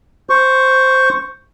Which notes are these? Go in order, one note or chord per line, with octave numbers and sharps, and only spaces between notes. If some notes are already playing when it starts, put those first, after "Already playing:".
C5 C#6